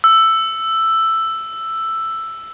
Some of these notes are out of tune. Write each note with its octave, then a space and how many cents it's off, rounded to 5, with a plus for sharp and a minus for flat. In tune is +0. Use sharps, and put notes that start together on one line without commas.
E6 +5